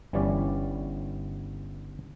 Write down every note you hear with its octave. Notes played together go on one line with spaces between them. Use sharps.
G1 E3 G3 C#4 D5